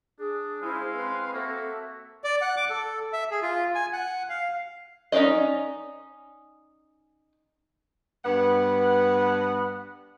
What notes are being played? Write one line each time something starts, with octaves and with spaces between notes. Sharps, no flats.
D4 G#4
G#3 C#4 E4 C5 F5
C4 B4 C6
A#3 F#4 A4 E5
D5
F#5
D6
A4
E5
G#4
F4
G#5
F#5
F5
C#4 D#4 G#4 D5 D#5
G2 B3 F#5